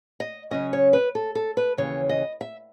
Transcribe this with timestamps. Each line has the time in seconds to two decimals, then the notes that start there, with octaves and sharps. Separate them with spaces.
0.20 D#5
0.51 C#3 F#3 C#4 D#5
0.73 C#5
0.93 B4
1.15 A4
1.35 A4
1.57 B4
1.77 D#2 C#3 E3 C#5
2.09 D#5
2.41 E5